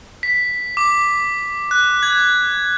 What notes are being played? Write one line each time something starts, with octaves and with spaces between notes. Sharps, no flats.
B6
D6
F#6
G#6